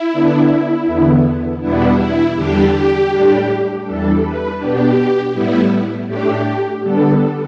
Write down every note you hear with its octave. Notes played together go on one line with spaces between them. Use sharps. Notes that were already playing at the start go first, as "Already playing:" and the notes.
Already playing: E4
D3 B3 D4
E2 D3 B3
E2 B2 G3 B3 D4 E4
E4
E2 D3 G3 D4 G4
G4
A2 G3 D4
E2 E3 G3 D4 A4
B4
B2 B3 D4 G4
A2 G3 B3 E4
A2 A3 D4 G4
D3 G3 B3 D4 A4